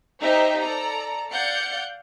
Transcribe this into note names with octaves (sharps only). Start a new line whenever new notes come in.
D#4 G4 C5 D#5 E5
A4 D5 A#5
D5 F5 F#5 G6 C#7